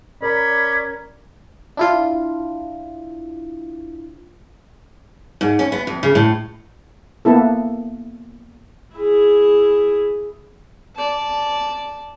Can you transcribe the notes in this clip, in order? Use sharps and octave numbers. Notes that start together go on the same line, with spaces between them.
C#4 A#4 D5 A#5 B5
D4 E4 F4
G#2
C#4
B3
F2
C#3
A2
A#3 B3 E4 A4
E4 G#4
D5 A5